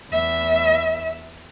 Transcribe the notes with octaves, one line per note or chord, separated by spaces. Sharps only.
E2 E5